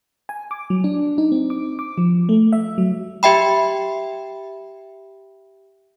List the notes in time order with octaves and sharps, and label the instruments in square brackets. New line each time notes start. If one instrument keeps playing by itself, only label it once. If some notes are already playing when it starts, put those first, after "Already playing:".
[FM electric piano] G#5
D6
F#3
D4
D#4
C4
D6
D6
F3
A3
E5
F#3
[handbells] G4 E5 G5 B5